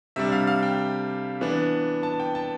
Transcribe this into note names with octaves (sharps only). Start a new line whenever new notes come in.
C3 G3 D4 E5
F5
F5
G5
E3 B3 D4
A5
G5
A5